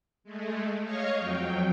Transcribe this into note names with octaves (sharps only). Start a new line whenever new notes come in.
G#3 A3
C#5 D#5 F5 C#6
F2 F#3 G5